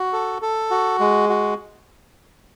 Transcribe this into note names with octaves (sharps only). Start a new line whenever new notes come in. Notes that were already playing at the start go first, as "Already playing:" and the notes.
Already playing: F#4
A4
A4
F#4
G#3
F#4